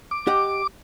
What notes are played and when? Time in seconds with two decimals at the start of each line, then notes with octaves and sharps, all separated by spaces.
0.11 D6
0.27 G4 D#5 F#5